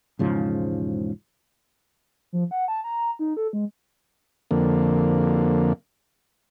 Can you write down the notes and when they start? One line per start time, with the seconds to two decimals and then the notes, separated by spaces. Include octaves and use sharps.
0.19 E1 G#2 C#3 F3
2.33 F3
2.51 F#5
2.68 A5
2.84 A#5
3.19 D#4
3.37 A4
3.53 G#3
4.51 F2 D3 A#3